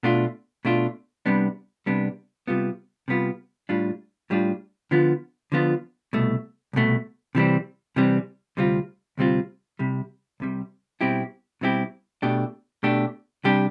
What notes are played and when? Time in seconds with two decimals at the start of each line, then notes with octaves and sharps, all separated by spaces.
0.03 B2 A3 D4 F4
0.65 B2 A3 D4 F4
1.26 C2 C3 G3 B3 D4
1.86 C2 C3 G3 B3 D4
2.47 C3 G3 B3 F4
3.08 C3 G3 B3 F4
3.69 A2 G3 D4 F4
4.30 A2 G3 D4 F4
4.91 D3 F3 B3 F4
5.52 D3 F3 B3 F4
6.13 C2 B2 A3
6.73 C2 B2 A3
7.35 C3 E3 G3 C4
7.96 C3 E3 G3 C4
8.57 D2 C3 G3 C4 F4
9.18 D2 C3 G3 C4 F4
9.79 C2 C3 G3
10.40 C2 C3 G3
11.01 B2 G3 C4 E4 G4
11.61 B2 G3 C4 E4 G4
12.22 B2 A3 D4 G4
12.83 B2 A3 D4 G4
13.44 C3 G3 D4 G4